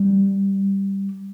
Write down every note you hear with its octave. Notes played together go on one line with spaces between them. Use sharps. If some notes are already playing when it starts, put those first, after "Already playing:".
Already playing: G3